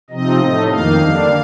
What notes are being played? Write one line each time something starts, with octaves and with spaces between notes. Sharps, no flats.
C3 F3 C4 D#4 D#5
A2 A3 D#4
F2 D#3 A#3 D#4 F5
D3 G3 A#3 D4